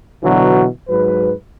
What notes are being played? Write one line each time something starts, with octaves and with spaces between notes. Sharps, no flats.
B2 D3 E3 F#3
G#2 F#3 B4